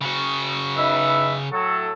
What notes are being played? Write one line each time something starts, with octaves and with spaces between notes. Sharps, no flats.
C#3 F#4
D#4 B4 E5
A2 F#3 A4